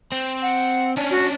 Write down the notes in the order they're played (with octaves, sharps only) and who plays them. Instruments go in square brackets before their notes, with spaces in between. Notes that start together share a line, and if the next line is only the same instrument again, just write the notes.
[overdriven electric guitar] C4
[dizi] F#5
[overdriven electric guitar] C#4 D4
[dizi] F#4